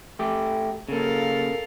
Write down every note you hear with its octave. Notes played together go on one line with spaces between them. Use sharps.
A3 G4
C#3 A#3 A4 A#4 F5